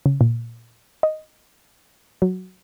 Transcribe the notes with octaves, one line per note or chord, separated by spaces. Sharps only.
C#3
A#2
D#5
F#3